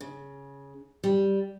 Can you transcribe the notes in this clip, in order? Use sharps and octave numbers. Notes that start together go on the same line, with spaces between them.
C#3
G3